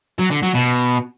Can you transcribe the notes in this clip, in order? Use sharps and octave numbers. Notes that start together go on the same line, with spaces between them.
F#3
D3
F#3
B2